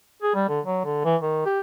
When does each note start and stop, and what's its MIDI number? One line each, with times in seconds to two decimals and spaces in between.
0.22 0.34 68
0.35 0.47 55
0.49 0.60 50
0.65 0.80 54
0.85 1.02 50
1.05 1.16 52
1.21 1.45 51
1.46 1.61 67